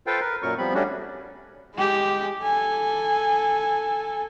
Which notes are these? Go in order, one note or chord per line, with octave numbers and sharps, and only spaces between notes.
F4 A4 B4 C5 F5 G5
A#4 B4
F#2 A#2 F#3 A#4 C#6
F3 G3 B3 C4 B5
G3 A3 C#4 D4 F#4
G#3 G4
A4 G#5